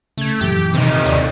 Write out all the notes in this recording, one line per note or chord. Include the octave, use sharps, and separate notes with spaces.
C#3 A3 G#6
F#2 A#2 E3 G4
C3 D#3 D#4
D#2 C#5 D5